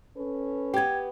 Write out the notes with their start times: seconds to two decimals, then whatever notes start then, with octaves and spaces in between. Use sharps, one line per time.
0.17 C#4 A4 B4
0.74 B3 G4 G5 G#6